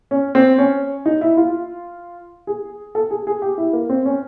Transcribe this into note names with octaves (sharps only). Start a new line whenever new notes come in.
C#4
C4
C#4
D#4
E4
F4
G#4
A4
G#4
G#4
G4
E4
A#3
C4
C#4